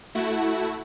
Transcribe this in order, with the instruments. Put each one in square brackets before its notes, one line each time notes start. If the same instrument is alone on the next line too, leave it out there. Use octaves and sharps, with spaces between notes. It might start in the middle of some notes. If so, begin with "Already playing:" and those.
[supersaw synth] A3 E4 F#4